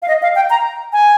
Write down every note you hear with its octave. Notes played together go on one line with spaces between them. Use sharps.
F5
D#5
F5
G5
A#5
G#5